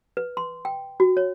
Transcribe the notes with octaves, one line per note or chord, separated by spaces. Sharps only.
B4
C6
G5
F#4
C#5